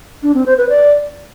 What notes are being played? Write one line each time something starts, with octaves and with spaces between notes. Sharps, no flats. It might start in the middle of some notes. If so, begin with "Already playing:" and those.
D4
C4
C5
B4
D5